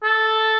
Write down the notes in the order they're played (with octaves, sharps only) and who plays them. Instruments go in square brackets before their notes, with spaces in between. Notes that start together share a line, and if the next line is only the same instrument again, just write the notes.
[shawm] A4